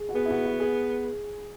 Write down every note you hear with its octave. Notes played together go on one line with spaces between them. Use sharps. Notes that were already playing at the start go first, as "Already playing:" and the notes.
Already playing: G#4
F#4
B3 G#4
E4
F#4
F#4
G#4